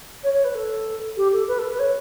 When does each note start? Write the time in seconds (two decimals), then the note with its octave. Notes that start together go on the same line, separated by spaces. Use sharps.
0.23 C#5
0.33 C#5
0.44 B4
0.54 A4
1.16 G4
1.32 A4
1.47 B4
1.58 A4
1.68 B4
1.79 C#5